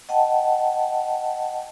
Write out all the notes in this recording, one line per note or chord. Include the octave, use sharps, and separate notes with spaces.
D#5 F#5 G5 A5